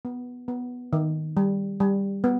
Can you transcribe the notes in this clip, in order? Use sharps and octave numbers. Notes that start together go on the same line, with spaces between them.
B3
B3
D#3
G3
G3
B3